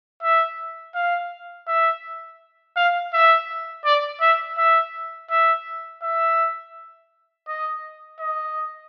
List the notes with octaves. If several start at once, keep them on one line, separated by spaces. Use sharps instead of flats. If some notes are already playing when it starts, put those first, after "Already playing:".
E5
F5
E5
F5
E5
D5
E5
E5
E5
E5
D#5
D#5